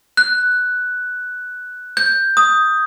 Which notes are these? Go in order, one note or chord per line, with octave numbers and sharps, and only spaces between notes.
F#6
G6
D#6